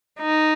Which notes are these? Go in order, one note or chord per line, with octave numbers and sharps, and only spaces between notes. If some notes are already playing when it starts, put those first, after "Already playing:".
D#4